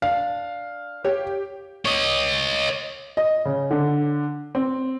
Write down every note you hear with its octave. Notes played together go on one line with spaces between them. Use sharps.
D4 F5
G4 C#5 G5
C#5 D#5
D#5
C#3
D3
C4